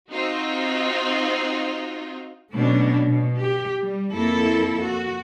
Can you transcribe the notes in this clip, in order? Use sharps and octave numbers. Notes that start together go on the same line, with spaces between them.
C4 D#4 F4 F#4
B2 F#3 A3 C#4 D4
B2
G4
G3
F2 A#3 E4 A4
F#4